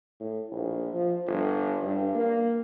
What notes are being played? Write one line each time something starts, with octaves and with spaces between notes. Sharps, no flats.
A2
A#1
F3
G1
G2
A#3